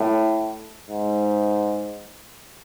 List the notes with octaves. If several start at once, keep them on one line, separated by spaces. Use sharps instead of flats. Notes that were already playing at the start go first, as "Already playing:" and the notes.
Already playing: A2
G#2